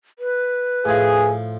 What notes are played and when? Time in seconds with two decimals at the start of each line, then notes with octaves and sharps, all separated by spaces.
0.19 B4
0.85 A2 F3 G#4